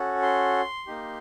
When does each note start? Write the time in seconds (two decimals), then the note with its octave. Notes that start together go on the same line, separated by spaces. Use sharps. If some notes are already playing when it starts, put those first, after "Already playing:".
Already playing: C#4 F#4 A4
0.22 C6
0.87 A#3 D#4 G4